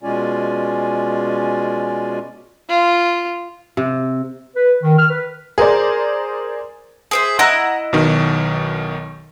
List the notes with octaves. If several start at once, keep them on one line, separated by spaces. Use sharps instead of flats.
B2 G#3 C#4 F4 D5 G#5
F4
C3
B4
D#3
F6
B4
G#4 A#4 C5 D5
G#4 C5 E5
E4 D#5 F#5 A#5 E6 F#6
B1 B2 D#3